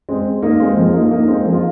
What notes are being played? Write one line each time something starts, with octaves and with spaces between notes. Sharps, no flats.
G#3 C4
A#3 D#4
G#3 C4
F3 A#3
A#3 D#4
A#3 D#4
G#3 C4
F3 A#3
F4